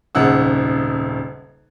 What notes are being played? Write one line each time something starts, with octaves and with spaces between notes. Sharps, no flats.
D#1 G#1 C#3 F#5 E6